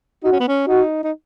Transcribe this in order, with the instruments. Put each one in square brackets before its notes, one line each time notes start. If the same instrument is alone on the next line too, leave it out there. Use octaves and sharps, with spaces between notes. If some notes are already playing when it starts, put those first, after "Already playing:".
[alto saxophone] D#4 [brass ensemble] F#4
[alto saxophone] C#4
B3
C#4
[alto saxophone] D#4 [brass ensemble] F#4
[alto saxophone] D#4